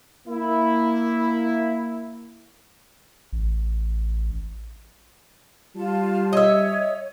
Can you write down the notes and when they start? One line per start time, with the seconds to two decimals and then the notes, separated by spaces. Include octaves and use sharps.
0.28 A#3 E4
3.33 A1
5.76 G3 F4 A5
6.33 C#5 D#5 E5